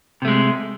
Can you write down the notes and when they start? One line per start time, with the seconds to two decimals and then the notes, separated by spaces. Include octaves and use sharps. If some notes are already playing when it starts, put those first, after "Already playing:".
0.22 C3
0.25 A3
0.28 G#3